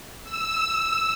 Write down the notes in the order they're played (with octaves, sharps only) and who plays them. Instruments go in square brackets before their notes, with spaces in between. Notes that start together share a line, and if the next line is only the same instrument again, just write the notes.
[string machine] E6